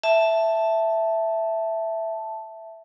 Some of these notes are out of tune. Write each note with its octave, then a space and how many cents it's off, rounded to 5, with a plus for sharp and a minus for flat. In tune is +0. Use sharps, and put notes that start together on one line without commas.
E5 +0 A5 +0